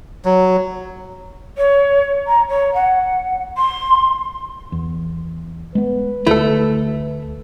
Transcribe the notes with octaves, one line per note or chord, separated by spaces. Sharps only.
F#3
C#5
A#5
C#5
F#5
C6
E2
G#3 B3 B4
D2 A3 E4 A4